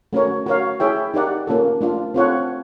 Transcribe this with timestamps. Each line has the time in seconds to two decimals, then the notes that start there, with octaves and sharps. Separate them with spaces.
0.13 A3 C#4 F#4 A#4 C#5
0.46 F#4 A#4 C#5 F5
0.80 E4 G#4 C#5 E5 G5
1.14 D#4 G4 A#4 D5 F#5
1.47 A#3 C#4 F4 A4
1.81 A3 D4 F4
2.14 C4 F4 A4 C#5 F#5